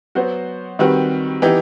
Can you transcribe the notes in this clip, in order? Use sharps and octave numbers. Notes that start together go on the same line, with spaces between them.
F#3 B3 F#4 C5
D#3 G3 C4 F#4 B4
E3 B3 D#4 G4